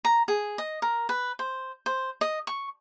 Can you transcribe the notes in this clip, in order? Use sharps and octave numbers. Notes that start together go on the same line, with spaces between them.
A#5
G#4
D#5
A#4
B4
C5
C5
D#5
C#6